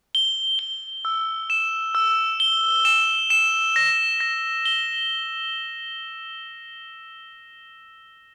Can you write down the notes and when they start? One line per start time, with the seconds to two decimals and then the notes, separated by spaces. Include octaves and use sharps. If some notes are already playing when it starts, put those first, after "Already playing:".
0.15 G7
0.59 G7
1.05 E6
1.50 E7
1.95 E6
2.40 G7
2.85 E7
3.30 E7
3.76 A#6
4.20 A#6
4.66 G7